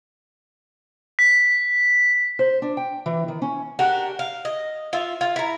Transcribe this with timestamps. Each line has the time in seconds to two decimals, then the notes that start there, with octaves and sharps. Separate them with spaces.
1.19 B6
2.39 C5
2.62 D4
2.77 G5
3.06 E3
3.28 D#3
3.42 C#4
3.79 D4 F#4 G4 A#4
4.19 F5
4.45 D#5
4.93 F4 E5
5.21 F4
5.36 E4 A#5